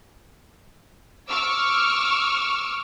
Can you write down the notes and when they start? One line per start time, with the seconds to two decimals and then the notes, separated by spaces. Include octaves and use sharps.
1.29 C#6 D6 E6 F6